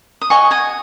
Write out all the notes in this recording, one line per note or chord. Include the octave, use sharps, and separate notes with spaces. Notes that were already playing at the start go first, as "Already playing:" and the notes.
D#6
F#4 D#5 G#5 C#6
D#5 G#5